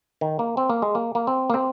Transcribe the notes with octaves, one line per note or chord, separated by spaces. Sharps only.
D#3
A#3
C4
A#3
G#3
A#3
A#3
C4
A#3
C4